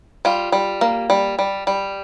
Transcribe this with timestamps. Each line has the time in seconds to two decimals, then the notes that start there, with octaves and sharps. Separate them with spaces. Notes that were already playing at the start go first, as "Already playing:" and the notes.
0.25 G3 F4
0.52 G3
0.81 A#3
1.10 G3
1.39 G3
1.67 G3